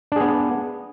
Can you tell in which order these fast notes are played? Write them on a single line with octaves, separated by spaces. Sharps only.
D4 G#4 B3